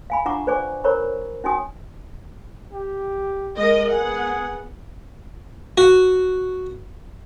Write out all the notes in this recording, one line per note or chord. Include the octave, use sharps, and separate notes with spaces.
F5 G#5 B5
D4 F4 F#5 A#5 C#6 D6
B4 C5 D5 G#5 C#6 D6
A#4 C5 C#5 A#5 B5 C#6
C#4 D#4 F#4 G#5 D#6
G4
G#3 A#4 D#5
B3 G#4 F#5
F#4